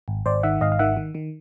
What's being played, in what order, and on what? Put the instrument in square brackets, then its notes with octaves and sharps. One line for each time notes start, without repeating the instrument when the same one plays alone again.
[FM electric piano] G#1
G#1 C5 D5
D#3 E5 F#5
G#1 D#5 F5
F5
D#3 E5 F#5
D#3
D#3